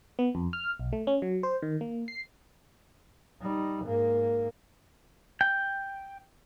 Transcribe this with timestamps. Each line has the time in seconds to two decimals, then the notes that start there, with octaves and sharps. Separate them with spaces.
0.19 B3
0.35 F2
0.53 F6
0.79 B1
0.93 A3
1.07 C#4
1.22 F#3
1.43 C5
1.62 D#3
1.81 A#3
2.08 C7
3.41 G3 D#4
3.85 G#2 A#3
5.41 G5